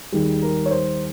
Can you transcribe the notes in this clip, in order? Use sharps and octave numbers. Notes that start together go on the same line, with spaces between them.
D#2 D#3 G3 G#4
A#4
C#5
C5